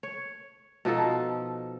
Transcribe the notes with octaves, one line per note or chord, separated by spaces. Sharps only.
C#5
B2 F3 D#4 A4